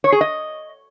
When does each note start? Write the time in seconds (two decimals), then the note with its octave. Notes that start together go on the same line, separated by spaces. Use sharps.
0.04 C#5
0.12 G#4
0.21 D#5